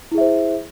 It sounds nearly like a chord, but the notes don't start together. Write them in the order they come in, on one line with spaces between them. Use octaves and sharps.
E4 G#4 E5 C5